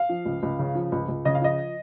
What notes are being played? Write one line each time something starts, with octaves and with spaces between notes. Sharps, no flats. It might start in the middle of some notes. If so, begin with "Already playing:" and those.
Already playing: F5
F3
C#2
C#2
C#3
F3
C#2
C#2
C#3 D#5
F5
F3 D#5